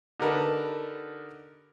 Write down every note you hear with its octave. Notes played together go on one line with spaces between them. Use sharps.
D3 D#4 G4 A#4 B4 A5